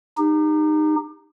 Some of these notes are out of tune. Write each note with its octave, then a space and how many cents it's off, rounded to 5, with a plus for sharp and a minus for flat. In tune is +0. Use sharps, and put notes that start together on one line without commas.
D#4 -20 G4 +30